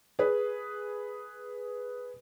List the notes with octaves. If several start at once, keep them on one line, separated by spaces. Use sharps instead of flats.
G#4 B4